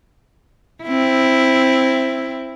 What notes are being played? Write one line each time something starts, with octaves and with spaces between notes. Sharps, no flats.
C4 E4